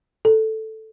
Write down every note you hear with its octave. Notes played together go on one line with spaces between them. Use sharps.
A4